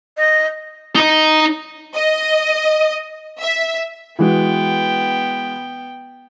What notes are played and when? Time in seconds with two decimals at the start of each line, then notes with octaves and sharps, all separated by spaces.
0.17 D#5
0.95 D#4 D#5
1.94 D#5
3.40 E5
4.19 E3 G#3 B3 F#4 G5